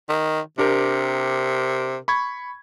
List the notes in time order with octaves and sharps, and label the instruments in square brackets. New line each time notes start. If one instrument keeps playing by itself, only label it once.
[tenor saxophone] D#3
[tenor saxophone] C3 [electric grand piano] D4 G4 A#4
[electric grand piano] B5 C#6 G#6